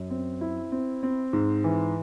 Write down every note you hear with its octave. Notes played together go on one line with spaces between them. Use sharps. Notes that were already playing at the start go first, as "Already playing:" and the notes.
Already playing: F#2
C4
E4
C4
C4
G#2
E3